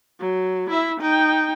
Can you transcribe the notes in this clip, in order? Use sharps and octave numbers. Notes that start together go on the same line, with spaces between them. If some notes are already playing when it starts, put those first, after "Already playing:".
F#3
E4 E5
D#4 G5